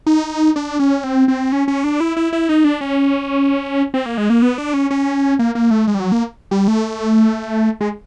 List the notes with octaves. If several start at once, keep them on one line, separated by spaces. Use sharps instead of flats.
D#4
D4
C#4
C4
C4
C#4
C#4
D4
E4
E4
E4
D#4
D4
C#4
C4
A#3
G#3
A#3
B3
D4
C#4
C#4
A#3
A#3
A3
G#3
G3
F#3
A#3
G3
A3
G#3